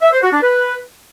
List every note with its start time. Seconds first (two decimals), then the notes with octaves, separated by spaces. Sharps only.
0.02 E5
0.12 C5
0.22 F#4
0.33 D4
0.43 B4